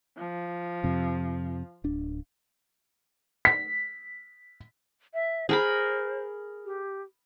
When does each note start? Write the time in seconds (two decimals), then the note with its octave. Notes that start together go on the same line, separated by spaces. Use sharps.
0.18 F3
0.84 F2 C3
1.84 D1 D4
3.45 B6
5.14 E5
5.49 G#4 A#4 C5 B5
6.65 G4